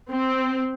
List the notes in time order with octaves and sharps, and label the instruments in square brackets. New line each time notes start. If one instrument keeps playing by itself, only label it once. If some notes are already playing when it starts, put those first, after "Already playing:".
[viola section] C4